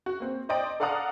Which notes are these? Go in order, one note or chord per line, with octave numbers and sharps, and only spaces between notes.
F#4
A#3 C4
C5 D5 D#5 G5 D7
A4 D5 F5 F#5 A#5 D#6